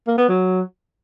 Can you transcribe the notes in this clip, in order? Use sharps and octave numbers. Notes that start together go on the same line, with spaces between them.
A#3
B3
F#3